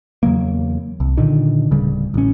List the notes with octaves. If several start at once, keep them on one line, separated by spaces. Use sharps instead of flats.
E2 C#3 F#3 A#3
C2
A#2 D3 D#3
D1 C#3 G3
A1 C#4